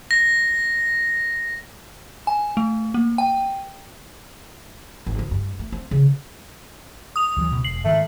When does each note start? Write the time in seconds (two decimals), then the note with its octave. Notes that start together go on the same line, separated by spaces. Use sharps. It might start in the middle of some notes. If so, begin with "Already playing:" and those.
0.11 A#6
2.27 G#5
2.57 A3
2.94 A#3
3.18 G5
5.06 G#1
5.19 D2
5.31 G2
5.59 A3
5.72 C4
5.91 C#3
7.16 D#6 F7
7.37 D2 E3 F#3
7.52 D2 B2
7.64 E1 C7 F#7
7.85 G#2 D#3 A3